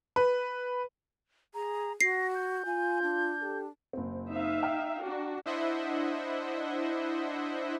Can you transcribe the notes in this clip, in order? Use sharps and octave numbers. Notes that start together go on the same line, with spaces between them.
B4
G#4 A#5
F#4 A#6 C7
G6
F4 G#5
D4
G4 A4
F#1 C4
D#4 E5 F5
G5 A#5 F6
D4 F#4
D4 E4 C5 D#5 E5 F#5